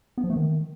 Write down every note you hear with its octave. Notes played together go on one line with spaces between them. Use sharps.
B3
F3
A3
D#3